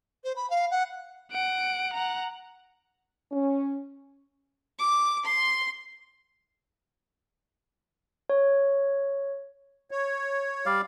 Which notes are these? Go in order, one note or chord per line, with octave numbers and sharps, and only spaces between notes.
C5
B5
F5
F#5
F#5 D7
F#5 A#5
C#4
D6
C6
C#5
C#5
G3 D5 F5